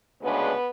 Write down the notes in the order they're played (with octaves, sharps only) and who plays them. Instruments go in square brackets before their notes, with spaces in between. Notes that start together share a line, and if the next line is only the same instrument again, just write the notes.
[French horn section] D2 C#3 G#3 B3 D4 B4